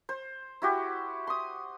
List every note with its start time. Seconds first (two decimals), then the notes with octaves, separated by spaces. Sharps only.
0.09 C5
0.62 E4 F#4 G4
1.27 C6 D#6